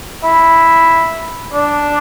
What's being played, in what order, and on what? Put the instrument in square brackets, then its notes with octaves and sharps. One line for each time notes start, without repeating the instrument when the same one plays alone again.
[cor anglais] E4
D4